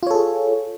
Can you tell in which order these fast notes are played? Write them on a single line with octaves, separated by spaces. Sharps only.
F4 C#5 A4 G#4